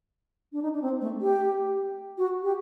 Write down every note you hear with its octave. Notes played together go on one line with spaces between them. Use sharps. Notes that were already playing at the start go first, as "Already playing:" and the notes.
D4
D#4
D4
C4
A3
G4
F#4
G4